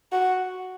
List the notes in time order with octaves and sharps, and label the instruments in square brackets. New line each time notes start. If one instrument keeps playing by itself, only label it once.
[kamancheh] F#4